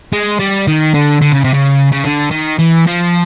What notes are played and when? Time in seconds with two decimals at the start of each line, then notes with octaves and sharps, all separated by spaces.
0.13 G#3
0.40 G3
0.67 D#3
0.94 D3
1.21 D3
1.32 C#3
1.44 C3
1.54 C#3
1.92 C#3
2.04 D3
2.31 D#3
2.59 E3
2.87 F3